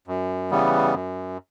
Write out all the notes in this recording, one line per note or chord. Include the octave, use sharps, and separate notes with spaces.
F#2
C#3 E3 G3 B3
F#2